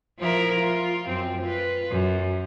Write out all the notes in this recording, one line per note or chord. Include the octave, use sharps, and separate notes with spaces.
F3 E4 A#4
F4
F#2 C4
F4 B4
F#2